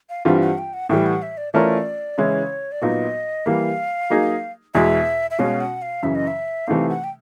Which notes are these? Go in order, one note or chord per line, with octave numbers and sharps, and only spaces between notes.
F5
G2 E3 G3 C4 F4 F#5
F#5
G5
F#5
A2 E3 G3 G5
F#5
E5
D5
E3 A3 C#4 F4 A#4 D5
C#3 E3 G#3 C#4 E4 C#5
D5
A#2 F#3 B3 D#4 F#4 D#5
E3 G3 A#3 F5
F#3 A#3 D#4 G#4
E2 B2 G#3 E5
E5
B2 G#3 C#4 F#4 F5
F#5
F5
F#2 C#3 E3 E5
D#5
E5
C3 E3 A3 C4 D#4 F5
F#5
G5